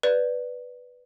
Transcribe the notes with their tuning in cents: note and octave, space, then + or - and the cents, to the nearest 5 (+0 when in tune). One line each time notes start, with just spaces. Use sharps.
B4 +0 D5 +0